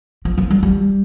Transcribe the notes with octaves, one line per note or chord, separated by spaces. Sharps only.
F3
F3
G3
G3